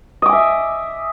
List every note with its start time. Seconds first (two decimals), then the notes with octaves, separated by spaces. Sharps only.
0.22 D#5
0.26 D6
0.29 G#5
0.33 E5